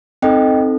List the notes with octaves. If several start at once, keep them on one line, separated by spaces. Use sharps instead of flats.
C4 D#4 A4 D#5 G5